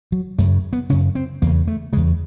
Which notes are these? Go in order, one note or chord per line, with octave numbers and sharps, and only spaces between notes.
F#3
F#2 C#3 A3
B3
F#2 C#3 C#4
C4
E2 C#3 A#3
A3
E2 C#3 G#3